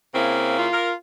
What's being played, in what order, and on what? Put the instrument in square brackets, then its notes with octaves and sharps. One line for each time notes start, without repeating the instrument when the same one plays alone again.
[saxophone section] C#3 A#3 E4 [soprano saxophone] C4
[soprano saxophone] F4
[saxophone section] A#4